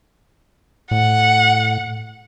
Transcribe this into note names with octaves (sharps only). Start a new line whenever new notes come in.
A2 F#5